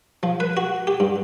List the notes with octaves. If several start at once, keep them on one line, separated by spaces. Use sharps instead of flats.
F3
B4
F#4
G4
G2